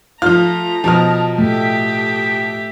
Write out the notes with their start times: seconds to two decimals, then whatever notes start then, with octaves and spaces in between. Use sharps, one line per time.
0.22 F3 A3 F4 A#5 F6
0.84 B2 F3 A5 F6
1.38 A3 G4 E5